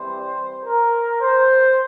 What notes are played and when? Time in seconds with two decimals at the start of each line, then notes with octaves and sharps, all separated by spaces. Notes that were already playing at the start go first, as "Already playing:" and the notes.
Already playing: E3 G3 C4 C5
0.65 A#4
1.21 C5